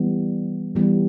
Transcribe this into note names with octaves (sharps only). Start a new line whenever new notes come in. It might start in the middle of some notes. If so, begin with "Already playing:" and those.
Already playing: E3 G3 B3
E3 G3 B3